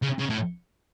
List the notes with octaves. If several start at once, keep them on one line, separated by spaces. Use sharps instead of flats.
C#3
C#3
A2